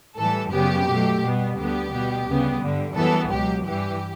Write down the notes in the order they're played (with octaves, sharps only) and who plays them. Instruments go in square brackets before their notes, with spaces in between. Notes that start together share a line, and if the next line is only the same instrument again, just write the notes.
[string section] A2 E3 G3 A4
F#2 C#3 G3 B3 G4
B2 F#3 A3
B2 G3 B3
D2 D3 G3 B3 G4
B2 G3 B3
D2 C#3 G3 B3
G2 D3 G3
F#2 E3 G3 B3 A4
C#2 B2 F#3 G4
G2 E3 G3 G4